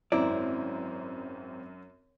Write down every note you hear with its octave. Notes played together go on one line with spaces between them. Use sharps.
G#1 F#2 C4 E4 D5 A#5